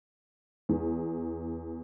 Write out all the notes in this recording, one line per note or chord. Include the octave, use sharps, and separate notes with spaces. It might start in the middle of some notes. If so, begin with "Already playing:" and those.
E2